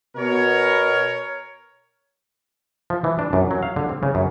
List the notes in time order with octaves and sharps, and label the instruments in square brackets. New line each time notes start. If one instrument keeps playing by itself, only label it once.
[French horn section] B2 [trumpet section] A#4 C#5
[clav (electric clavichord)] F3
E3
D4
F#2
F#3
F5
D3
C4
C#3
F#2